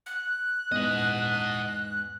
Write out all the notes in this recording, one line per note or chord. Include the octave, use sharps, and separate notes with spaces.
F#6
E2 G#2 D#5 F#5